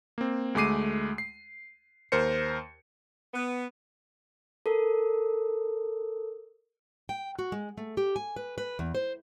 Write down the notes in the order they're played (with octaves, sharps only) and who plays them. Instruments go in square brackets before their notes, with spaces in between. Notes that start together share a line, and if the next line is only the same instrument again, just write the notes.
[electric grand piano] A#3 C4
D2 G#3 A3 D6 C7 D#7
C7
D#2 A#4 C5 C#7
[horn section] B3
[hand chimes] A4 A#4
[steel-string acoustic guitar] G5
F#4
G#3
A3
G4
G#5
B4
B4
E2
C5